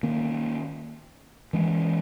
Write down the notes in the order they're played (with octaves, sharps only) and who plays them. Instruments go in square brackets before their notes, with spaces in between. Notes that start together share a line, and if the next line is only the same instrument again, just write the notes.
[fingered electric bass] D#3 A#3 C#4
E3 G#3 C#4